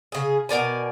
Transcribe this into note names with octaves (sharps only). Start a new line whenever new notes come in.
C#3 G#4
B2 A#4 D5 G#5